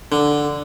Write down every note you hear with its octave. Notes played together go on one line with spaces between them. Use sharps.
D3